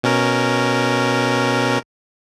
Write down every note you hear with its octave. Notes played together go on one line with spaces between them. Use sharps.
B2 C#4 A#4